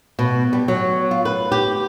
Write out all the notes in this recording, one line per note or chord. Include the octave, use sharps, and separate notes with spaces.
B2
G3
F#3
F4
B4
G4